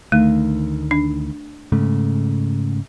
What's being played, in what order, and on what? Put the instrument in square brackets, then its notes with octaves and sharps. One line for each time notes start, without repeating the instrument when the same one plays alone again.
[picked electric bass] D2 D#3 [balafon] A3
[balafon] D4
[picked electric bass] G#2 C#3 A3